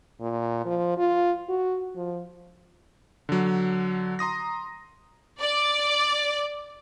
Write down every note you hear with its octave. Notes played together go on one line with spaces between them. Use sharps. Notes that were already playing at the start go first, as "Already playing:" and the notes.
A#2
F3
F4
F#4
F3
D3 F#3
A#5 C6 D#6 A#6
D5